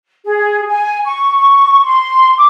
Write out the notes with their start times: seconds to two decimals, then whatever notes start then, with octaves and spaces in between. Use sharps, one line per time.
0.25 G#4
0.68 G#5
1.04 C#6
1.83 C6
2.36 D6